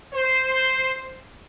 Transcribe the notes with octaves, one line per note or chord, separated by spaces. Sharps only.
C5